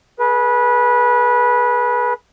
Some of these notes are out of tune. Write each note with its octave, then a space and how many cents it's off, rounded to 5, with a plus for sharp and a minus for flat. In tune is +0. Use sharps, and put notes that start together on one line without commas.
G#4 +30 B4 -20